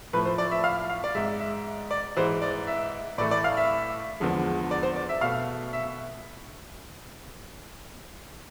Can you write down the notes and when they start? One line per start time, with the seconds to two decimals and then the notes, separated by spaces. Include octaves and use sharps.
0.13 A2 F3 A3 B4
0.26 C5
0.38 D5
0.51 E5
0.64 F5
0.90 F5
1.04 D5
1.15 G#2 G#3 E5
1.40 E5
1.91 D5
2.17 G#2 E3 G#3 C5
2.41 D5
2.67 E5
3.18 A2 E3 A3 D5
3.31 D5
3.44 F5
3.57 E5
4.20 E2 D3 F3 G#3
4.71 D5
4.83 C5
4.96 D5
5.09 E5
5.21 B2 A3 F5
5.73 E5